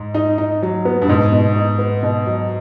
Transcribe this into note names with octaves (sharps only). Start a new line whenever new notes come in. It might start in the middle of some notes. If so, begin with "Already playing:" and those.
Already playing: G#2
D#4
D#4
F#3
B3
G2
G#2 B2
B2
D#4
B3
B2
F#3